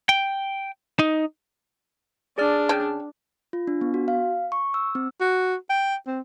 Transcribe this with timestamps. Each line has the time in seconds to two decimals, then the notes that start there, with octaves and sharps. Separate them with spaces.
0.09 G5
0.99 D#4
2.38 D4 G#4 D5 F6
2.69 C#3 G5 A5
3.53 F4
3.67 D4
3.81 B3
3.94 F#4
4.08 F5
4.52 C#6
4.74 E6
4.95 C4
5.20 F#4
5.70 G5
6.07 C4